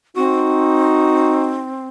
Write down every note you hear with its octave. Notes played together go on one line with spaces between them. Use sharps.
C4 D#4 F#4